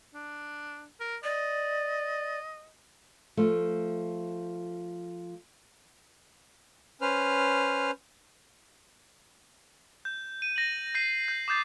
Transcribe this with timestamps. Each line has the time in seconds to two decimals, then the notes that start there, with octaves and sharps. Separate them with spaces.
0.14 D4
1.00 A#4
1.24 D5 D#5
3.37 F3 A3
7.01 C#4 B4 C5 F6
10.05 G6
10.42 D#7
10.56 A#6 F#7
10.94 G6 A#6 C7 D#7
11.28 G6
11.48 D6 D#6 G6 A6 C7